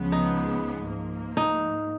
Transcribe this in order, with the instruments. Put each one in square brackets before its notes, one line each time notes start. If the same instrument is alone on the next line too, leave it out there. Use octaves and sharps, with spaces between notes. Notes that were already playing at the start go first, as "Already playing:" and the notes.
Already playing: [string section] C#2 C#3 F3 G#3 B3
[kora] D#4
[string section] G#2 F3 A#3
[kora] D#4